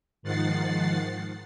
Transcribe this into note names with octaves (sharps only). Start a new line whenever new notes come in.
G#2 D#3 F3 F#5 A6 C7